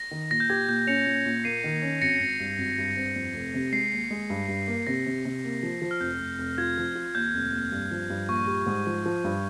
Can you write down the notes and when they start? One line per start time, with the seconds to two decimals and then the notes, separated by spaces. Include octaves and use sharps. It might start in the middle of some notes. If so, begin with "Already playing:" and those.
Already playing: A#6
0.11 D#3
0.31 A#2 A#6
0.40 G6
0.50 G4 G#6
0.68 A#2 G6
0.87 C#4 C#7 F7
1.06 A#2
1.26 A#2
1.44 A#3 C7 D#7
1.64 D#3
1.82 C#4
2.01 G#1 A#6 C#7
2.20 G#1
2.40 G2
2.58 G#1
2.78 G2
2.97 C4
3.16 F2
3.34 F1
3.54 C3
3.72 G#3 C7
3.92 D#2
4.10 G#3
4.30 G2
4.48 G2
4.68 A#3
4.87 C3 A#6
5.06 C3
5.25 C3
5.44 A#3
5.63 F3
5.82 F3
5.91 F6
6.00 F1 G6
6.20 F1
6.38 F1
6.58 F4 G#6
6.77 F3
6.95 F4
7.15 D#2 G6
7.34 F1
7.53 D#2
7.72 G2
7.91 F3
8.10 G2
8.28 A#1 C#6
8.47 G3
8.66 G#2
8.87 F3
9.06 F3
9.24 G2